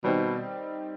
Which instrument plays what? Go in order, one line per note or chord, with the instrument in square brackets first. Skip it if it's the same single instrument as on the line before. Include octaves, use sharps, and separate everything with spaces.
[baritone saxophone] B2 [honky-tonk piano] D#3 G3 C4 D#4